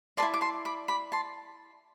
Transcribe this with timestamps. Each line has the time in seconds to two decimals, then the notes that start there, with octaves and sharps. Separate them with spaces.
0.17 B4 D5 A5 C6
0.22 E4
0.34 D6
0.41 A5 C6
0.65 B5 D6
0.88 B5 D6
1.12 A5 C6